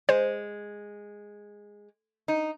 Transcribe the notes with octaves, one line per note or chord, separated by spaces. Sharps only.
G#3 C5
D#4